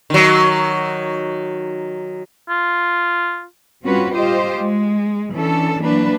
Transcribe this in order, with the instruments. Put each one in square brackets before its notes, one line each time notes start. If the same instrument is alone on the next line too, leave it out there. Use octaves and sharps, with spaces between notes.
[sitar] D#3 F#3
[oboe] F4
[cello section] G3 C4 C#4 F4 F#4 B4
F4 G4 C5 D#5
G#3
E3 C#4 D4 A4
E3 F#3 A#3 D4 B4